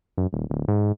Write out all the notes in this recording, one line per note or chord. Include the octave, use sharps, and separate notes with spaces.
F#2
D#1
D1
G#2